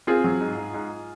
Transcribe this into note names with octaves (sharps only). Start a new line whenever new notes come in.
C4 F4 G#4
F#3
G#2
G#2
G#2